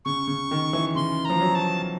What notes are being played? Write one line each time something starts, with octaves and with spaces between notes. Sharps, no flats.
C#3 C#6
C#3
D#3
E3
C#3 C6
F3 A#5
F#3
A5